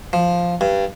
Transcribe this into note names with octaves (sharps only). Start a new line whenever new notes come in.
F3
G2